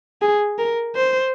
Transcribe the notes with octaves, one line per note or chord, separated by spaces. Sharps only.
G#4
A#4
C5